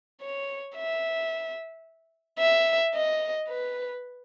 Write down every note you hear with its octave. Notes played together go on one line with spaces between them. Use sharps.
C#5
E5
E5
D#5
B4